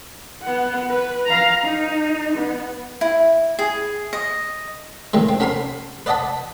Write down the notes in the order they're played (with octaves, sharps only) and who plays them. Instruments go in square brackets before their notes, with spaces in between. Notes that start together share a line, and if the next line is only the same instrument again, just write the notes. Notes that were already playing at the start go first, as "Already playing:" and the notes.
[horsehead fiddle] B3 F#5
B4
F5 A#5
D#4
B3
[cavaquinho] E4
G#4
D#5
[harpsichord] A#2 D#3 E3 G#3
C4
C#4 F#4 A#4 B5 C6
B4 D5 D#5 F#5 A5 B5